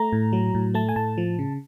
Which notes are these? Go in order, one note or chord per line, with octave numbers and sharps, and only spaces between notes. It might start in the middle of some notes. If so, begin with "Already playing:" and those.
Already playing: A3 A#5
A2
F#3
A2
A3 A5
G#5
A2 A5
F3
C#3